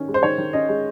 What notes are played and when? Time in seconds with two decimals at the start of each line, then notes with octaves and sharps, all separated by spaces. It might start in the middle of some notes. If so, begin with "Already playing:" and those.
Already playing: D#3 C#4
0.08 G#3
0.14 C5
0.23 D#3 C#5
0.38 D#3
0.53 C#4 D#5
0.69 G#3